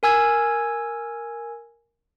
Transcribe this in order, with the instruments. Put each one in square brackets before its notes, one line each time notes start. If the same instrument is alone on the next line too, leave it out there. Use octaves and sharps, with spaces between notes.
[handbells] A#4 G#5 E6 G#6